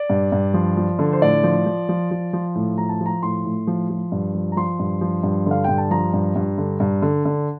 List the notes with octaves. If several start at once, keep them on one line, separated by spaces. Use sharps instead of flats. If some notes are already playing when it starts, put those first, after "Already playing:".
Already playing: D5
G2
G2
F3
F3
D3
C5
A2 D5
F3
F3
F3
F3
F3
A2
F3 A#5
A5
F3
A#5
A2 C6
A2
F3
F3
G2
F3
A#5
F3 C6
G2
F3
G2
D3 F5
G2 G5
A5
F3 A#5
G2
G2
D3
G2
D3
D3